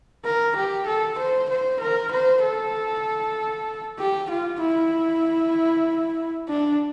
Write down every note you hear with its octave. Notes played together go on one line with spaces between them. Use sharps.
A#4
G4
A4
C5
C5
A#4
C5
A4
G4
F4
E4
D4